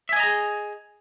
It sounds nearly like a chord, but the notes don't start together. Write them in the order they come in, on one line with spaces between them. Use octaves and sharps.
E5 G#5 D#5 A#5 G#4